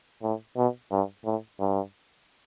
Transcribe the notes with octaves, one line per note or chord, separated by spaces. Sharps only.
A2
B2
G2
A2
G2